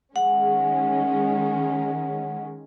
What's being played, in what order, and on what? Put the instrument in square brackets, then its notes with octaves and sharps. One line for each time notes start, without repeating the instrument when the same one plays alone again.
[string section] D#3 G#3 C#4 [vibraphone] F#5